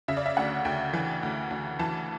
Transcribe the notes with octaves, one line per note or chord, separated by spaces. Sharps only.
C#3 E5
D5
E5
D2 F#5
D2 G5
E3
D2
D2
E3 A5